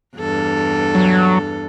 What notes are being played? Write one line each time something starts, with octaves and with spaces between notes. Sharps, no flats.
E2 G2 A4
F#3